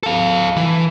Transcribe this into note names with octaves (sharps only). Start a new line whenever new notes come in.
A4 F5
E3